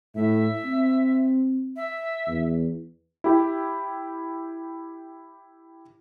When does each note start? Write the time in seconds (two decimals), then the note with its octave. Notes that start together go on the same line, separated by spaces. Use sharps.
0.15 A2 E5
0.65 C4
1.76 E5
2.27 E2
3.24 E4 G4